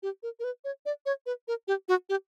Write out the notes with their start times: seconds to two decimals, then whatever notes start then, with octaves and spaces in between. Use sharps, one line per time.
0.03 G4
0.23 A#4
0.40 A#4
0.44 B4
0.64 C#5
0.86 D5
1.06 C#5
1.26 B4
1.48 A#4
1.68 G4
1.88 F#4
2.09 G4